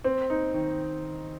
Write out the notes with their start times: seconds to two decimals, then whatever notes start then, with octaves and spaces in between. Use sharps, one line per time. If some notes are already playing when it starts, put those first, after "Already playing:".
0.04 C4
0.30 D#4
0.54 D#3